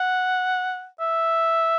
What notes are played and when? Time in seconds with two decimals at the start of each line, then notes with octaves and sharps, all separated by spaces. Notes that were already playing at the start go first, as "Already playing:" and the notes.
Already playing: F#5
1.00 E5